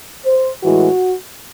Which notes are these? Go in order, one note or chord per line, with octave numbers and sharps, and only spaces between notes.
C5
A2 E3 G#3 F#4